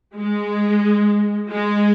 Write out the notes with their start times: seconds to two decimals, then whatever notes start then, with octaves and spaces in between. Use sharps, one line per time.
0.16 G#3
1.50 G#3